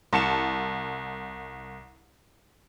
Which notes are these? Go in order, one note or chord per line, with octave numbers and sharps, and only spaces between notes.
C2 A5 C#7 E7